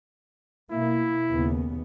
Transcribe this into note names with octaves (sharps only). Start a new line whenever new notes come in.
B2 A#3 E4
D#2 C#3 B3